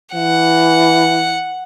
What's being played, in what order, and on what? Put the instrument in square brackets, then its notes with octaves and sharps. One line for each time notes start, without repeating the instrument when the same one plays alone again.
[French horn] E3 [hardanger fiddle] F#5